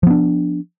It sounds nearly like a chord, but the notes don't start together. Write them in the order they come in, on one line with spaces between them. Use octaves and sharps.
F3 B3 D4